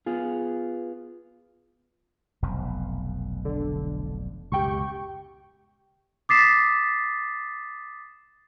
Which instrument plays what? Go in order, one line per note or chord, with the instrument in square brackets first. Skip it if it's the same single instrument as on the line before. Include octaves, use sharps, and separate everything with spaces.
[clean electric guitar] B3 F4 G#4
[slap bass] F1 B1 F2
[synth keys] D3
[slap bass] C#2 F#2 B2 [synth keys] G4 G5 C#6
[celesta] D6 D#6 A6 B6 C7 E7